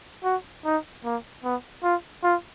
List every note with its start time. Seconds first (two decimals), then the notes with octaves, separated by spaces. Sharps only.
0.24 F#4
0.65 D#4
1.05 A#3
1.44 B3
1.83 F4
2.24 F4